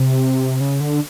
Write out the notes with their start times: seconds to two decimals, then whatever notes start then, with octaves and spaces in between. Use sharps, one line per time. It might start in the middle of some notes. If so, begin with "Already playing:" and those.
Already playing: C3
0.61 C#3
0.80 D3